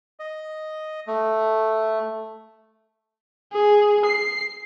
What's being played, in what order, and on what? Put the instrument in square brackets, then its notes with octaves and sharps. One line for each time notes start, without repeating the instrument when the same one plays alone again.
[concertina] D#5
A3
[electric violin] G#4
C7